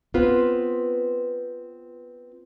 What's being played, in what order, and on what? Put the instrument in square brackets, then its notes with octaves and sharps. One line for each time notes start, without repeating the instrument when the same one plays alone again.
[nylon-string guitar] B3 C4 F4 B4